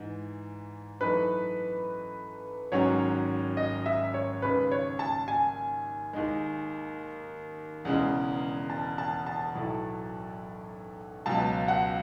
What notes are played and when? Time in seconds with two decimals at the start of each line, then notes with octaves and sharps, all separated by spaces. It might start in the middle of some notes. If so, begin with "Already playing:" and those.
Already playing: G#2 E3
1.00 F#2 E3 A3 D#4 B4
2.72 G#1 G#2 F#3 C#4 F#4 C#5
3.57 D#5
3.86 E5
4.14 C#5
4.42 D#2 C#3 G#3 B4
4.72 C#5
4.99 A5
5.28 G#5
6.13 D#2 D#3 G#3
7.85 E1 E2 C#3 G#3
8.70 A5
8.98 A5
9.26 A5
9.55 B1 A2 F#3 A3
11.26 C#2 B2 F#3 A5
11.68 F#5